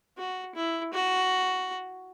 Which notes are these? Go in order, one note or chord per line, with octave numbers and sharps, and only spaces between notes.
F#4
E4
F#4